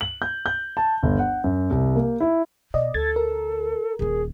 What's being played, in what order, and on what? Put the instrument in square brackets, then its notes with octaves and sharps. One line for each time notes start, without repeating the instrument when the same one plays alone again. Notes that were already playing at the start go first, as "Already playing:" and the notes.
[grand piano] F#7
G6
G6
A5
G1
F#5
F#2
C2
A#3
E4
[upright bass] B2 [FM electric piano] D5 D#5
[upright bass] D2 [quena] A4 [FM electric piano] G#6 A6
[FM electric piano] A#4
[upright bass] D#1 D#3 [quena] G#4